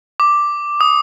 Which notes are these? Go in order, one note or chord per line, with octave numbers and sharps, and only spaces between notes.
D6
D#6